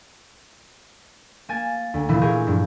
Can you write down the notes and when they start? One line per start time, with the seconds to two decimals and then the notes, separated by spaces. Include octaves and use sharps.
1.49 A#3 G#5 A6 E7
1.94 D2
2.09 A#2 E3 A#3 E4
2.21 A#2 E3 G#4 A#4 C#6 G6
2.47 G2 F3